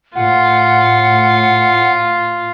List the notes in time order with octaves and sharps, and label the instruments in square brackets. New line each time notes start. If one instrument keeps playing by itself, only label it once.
[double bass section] A2 [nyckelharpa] F4 [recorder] F#5